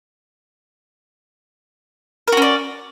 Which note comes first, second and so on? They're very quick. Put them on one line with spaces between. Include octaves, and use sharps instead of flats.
A#4 F#4 C#4 D5